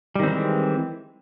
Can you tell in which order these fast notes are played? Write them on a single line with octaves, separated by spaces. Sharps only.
G3 D#3 C4 E3 G#3